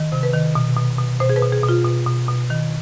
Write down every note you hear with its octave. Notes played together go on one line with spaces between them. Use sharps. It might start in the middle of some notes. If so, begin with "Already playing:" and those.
Already playing: D#3
C3
B4
D#3
B2
B2
B2
B2 C5
G#4
B4
B2
G#4
B2 F4
B2
B2
B2
D#3